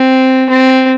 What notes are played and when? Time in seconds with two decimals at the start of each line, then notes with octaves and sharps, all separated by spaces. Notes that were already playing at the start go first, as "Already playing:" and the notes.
Already playing: C4
0.50 C4